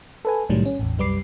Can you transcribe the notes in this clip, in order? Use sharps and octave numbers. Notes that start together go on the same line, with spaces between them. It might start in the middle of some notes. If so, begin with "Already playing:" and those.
A4 B4 G#5
C2 A2 D#3 F#3 G3
C#4
A1 E2
C2 F#2 G3 B4 D6 C7